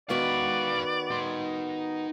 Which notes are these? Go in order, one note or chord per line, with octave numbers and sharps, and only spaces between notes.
D#3 B3 F#4 B4 D5 F5
D#4 C6